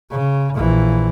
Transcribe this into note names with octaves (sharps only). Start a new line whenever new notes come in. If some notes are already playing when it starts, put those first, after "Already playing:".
C#3
A#1 E3